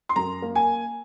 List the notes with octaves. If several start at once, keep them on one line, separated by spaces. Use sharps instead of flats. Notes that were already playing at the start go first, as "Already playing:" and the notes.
C6
F#2 A#5
A#3
G#5